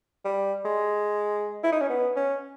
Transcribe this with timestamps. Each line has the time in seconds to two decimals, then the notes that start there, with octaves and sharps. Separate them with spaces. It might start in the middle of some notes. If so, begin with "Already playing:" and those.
0.25 G3
0.65 G#3
1.64 E4
1.72 D#4
1.81 C#4
1.89 B3
2.16 C#4